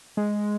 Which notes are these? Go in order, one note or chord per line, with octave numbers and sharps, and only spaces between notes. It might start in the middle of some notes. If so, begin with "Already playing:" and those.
G#3